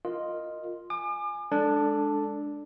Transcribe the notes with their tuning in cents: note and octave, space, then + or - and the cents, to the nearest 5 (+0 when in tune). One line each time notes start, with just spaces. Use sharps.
F4 +0 A#4 -10 D#5 +0
G#5 +0 D6 +40
G#3 +0 D4 +0 A4 +0